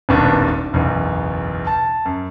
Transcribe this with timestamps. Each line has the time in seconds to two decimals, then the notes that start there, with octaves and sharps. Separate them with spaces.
0.09 D#1 G#1 G2 B2 D4
0.73 F#1 B1 E2
1.67 A5
2.06 F#2